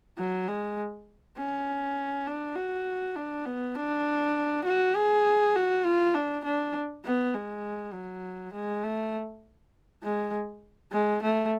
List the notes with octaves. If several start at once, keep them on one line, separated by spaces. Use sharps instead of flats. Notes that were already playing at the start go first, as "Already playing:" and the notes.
F#3
G#3
C#4
D4
F#4
D4
B3
D4
F#4
G#4
F#4
F4
D4
D4
B3
G#3
F#3
G#3
A3
G#3
G#3
A3